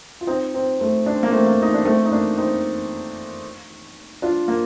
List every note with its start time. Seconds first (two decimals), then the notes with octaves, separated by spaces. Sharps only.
0.21 F4
0.27 C4 D#4
0.54 C4 D#4
0.80 A3 C4
1.06 D4
1.15 C4
1.23 A#3
1.31 A3 C4
1.47 A#3
1.62 D#4
1.74 D4
1.85 A3 C4
2.05 D#4
2.12 A#3 D4
2.38 C4 D#4
4.22 D4 F4
4.48 A#3